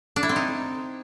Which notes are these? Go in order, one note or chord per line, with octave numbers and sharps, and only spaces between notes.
D4
E4
C4
D#4